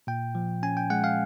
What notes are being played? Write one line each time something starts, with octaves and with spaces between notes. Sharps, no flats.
A#2 G5
F3
C#4 G#5
G5
G#3 F#5
F5